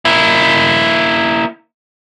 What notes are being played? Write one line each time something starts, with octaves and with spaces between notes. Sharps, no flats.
A#3 E4